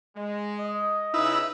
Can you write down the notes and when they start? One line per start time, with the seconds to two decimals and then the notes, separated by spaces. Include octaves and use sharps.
0.16 G#3
0.60 D#5
1.14 C#3 D#4 E4 B4